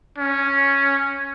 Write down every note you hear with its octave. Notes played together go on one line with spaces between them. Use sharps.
C#4